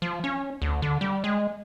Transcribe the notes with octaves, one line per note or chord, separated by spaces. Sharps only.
F3
C#4
D2
D3
G3
G#3